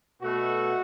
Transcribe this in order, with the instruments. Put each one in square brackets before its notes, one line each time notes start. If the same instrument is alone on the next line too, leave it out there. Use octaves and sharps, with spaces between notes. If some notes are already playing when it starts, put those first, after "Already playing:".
[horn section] B2 A3 F#4